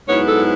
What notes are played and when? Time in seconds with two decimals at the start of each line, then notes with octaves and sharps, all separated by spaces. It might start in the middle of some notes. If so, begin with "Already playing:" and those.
0.08 G#2 F#3 B3 E4 C#5
0.29 A4